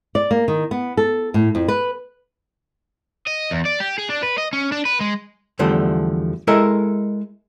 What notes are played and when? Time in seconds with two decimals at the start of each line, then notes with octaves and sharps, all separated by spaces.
0.15 D5
0.31 A#3
0.48 D#3
0.71 B3
0.97 A4
1.34 A2
1.55 F2
1.68 B4
3.27 D#5
3.51 E2
3.65 D5
3.80 G4
3.99 G#4
4.10 D4
4.23 B4
4.38 D#5
4.53 C#4
4.72 D4
4.85 B4
5.00 G#3
5.59 E2 D3 F3 G3 A3
6.47 G#3 E4 A4 A#4 D#5 E5